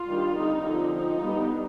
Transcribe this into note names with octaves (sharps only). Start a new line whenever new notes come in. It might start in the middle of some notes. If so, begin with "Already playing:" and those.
Already playing: F4
D#3 G3 D4
D3 G3 C4 D#4
D3 F3 C4
F3 C4 D#4
G3 B3 D4